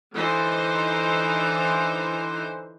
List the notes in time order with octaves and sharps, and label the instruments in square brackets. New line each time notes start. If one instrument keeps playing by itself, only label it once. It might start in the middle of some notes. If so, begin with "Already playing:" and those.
[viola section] D3 E3 D#4 C5